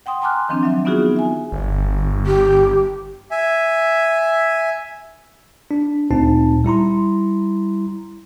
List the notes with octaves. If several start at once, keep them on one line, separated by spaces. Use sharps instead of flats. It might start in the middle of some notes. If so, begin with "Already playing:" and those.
F#5 G5 C6 D#6
G#5 A#5 C6 D6 F6 F#6
D#3 F3 C4 D4
F#3 E5
B3 C#4 D#4 F4 F#4 G#4
E5 G#5
G1
G4
E5 G#5
D4
D2 A#2 C4 D#4 A5
G3 E4 A#5 C6